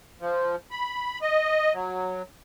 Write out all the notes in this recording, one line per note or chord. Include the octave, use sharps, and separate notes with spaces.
F3
B5
D#5
F#3